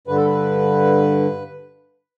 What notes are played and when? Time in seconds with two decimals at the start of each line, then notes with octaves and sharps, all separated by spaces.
0.07 G2 D3 B4
0.16 A4
0.25 B4